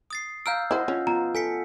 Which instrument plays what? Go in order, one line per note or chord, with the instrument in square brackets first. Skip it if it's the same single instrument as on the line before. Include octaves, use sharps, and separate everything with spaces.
[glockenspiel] D#6 A6 C7
[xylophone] F5 A#5 D7 [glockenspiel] E6 F6 G6
[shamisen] E4 C5 [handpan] D#5 F#5
[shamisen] C#4 [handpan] F4
[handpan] B3 F4 [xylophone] A#5
[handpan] A4 [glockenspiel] G#5 B6 C#7